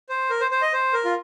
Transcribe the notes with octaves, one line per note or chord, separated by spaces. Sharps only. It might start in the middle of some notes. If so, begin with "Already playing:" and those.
C5
A#4
C5
C5
D#5
C5
A#4
F4